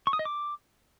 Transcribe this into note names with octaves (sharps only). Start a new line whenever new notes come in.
C#6
D#6
D#5
D6